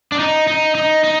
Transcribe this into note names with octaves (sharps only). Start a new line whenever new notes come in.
D4
D#4
D#4
D#4
D#4